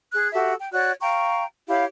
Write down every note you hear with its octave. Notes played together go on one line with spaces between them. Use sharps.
G#4 F#6
F#4 G4 A4 E5
G5
F#4 C#5 D5 F#6
F5 G5 A#5 C#6
E4 G4 C#5 F5